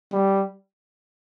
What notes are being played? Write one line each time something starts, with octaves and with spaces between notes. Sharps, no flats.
G3